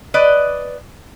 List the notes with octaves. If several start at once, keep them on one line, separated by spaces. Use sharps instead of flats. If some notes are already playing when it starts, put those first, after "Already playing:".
B4 D5 D#5